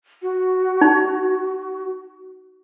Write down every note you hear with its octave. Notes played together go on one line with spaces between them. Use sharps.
F#4
D#4